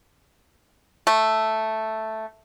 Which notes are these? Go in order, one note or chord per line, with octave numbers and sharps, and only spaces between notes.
A3